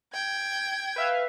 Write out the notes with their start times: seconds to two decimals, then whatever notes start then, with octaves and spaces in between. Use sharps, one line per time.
0.14 G5 G#6
0.96 B4 E5 F5